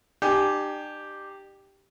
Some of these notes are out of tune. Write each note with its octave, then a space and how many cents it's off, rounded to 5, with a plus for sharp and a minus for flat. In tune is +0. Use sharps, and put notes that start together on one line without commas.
D4 +45 G4 +0 G#5 +15